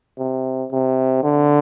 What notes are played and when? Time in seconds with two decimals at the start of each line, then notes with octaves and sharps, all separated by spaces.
0.19 C3
0.71 C3
1.23 D3